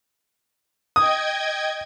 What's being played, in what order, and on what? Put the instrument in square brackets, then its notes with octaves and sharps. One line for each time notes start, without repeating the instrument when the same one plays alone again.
[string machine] D#5 G5 G#6 [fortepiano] D#6